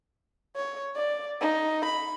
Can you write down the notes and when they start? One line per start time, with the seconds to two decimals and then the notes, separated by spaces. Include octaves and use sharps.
0.56 C#5
0.96 D5
1.41 D#4
1.85 B5